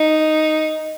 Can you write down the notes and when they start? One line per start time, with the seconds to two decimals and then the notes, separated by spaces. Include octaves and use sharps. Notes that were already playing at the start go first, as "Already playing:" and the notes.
Already playing: D#4